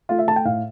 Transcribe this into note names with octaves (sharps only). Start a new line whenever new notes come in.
A3 F4
E5
A3 A5
G5
A2 F5